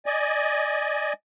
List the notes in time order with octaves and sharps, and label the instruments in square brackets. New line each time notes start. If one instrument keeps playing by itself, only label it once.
[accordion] D5 D#5 G#5